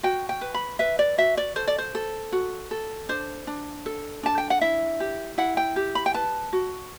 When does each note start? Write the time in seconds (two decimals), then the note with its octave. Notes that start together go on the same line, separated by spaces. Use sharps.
0.03 F#4 G5
0.29 G5
0.41 B4
0.54 B5
0.79 B4 E5
0.99 D5
1.18 F#4 E5
1.37 D5
1.56 A4 C5
1.67 D5
1.78 C5
1.95 A4
2.32 F#4
2.71 A4
3.09 D4 C5
3.47 D4
3.86 A4
4.23 D4 A5
4.38 G5
4.50 F#5
4.61 E4 E5
5.00 G4
5.38 E4 F#5
5.57 G5
5.76 G4
5.95 B5
6.06 G5
6.14 B4 A5
6.53 F#4